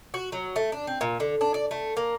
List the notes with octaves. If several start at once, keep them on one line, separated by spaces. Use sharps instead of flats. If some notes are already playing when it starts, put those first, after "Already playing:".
F#4
F#3
A3
D4
C4
A#2
D3
D4
D5
A3
A#3